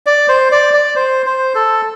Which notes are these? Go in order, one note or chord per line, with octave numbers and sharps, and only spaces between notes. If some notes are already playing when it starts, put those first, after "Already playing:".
D5
C5
D5
D5
C5
C5
A4